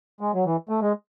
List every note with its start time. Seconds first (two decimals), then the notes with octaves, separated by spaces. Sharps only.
0.21 G#3
0.34 F#3
0.45 E3
0.69 A3
0.82 G#3